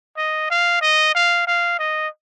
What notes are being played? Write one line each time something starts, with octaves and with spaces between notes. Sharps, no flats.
D#5
F5
D#5
F5
F5
D#5